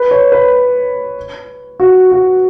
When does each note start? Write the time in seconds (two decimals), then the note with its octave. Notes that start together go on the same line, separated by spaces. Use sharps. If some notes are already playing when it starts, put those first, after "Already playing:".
Already playing: B4
0.11 C#5
0.32 B4
1.80 F#4
2.12 F#4